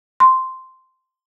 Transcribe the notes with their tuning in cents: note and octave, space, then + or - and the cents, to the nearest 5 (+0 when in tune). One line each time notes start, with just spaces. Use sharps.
C6 -5